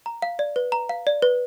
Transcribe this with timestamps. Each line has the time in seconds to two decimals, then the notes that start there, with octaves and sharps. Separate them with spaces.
0.06 A#5
0.22 F5
0.39 D5
0.56 B4
0.72 A#5
0.89 F5
1.07 D5
1.22 B4